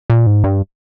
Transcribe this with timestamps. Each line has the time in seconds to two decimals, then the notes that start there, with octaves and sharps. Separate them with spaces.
0.10 A#2
0.27 G#2
0.44 G2